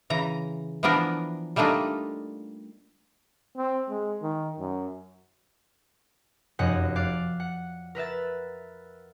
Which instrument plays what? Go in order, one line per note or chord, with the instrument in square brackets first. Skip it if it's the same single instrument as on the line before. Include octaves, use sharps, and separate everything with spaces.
[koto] C#3 E3 A#5
E3 F3 B3 D4 A#4
G3 A3 A#3 D4 D#4 F4
[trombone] C4
G#3
D#3
F#2
[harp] F1 F#2 D#5 F#5
D5 F5 F#6
F#5
A#4 B4 E5 A6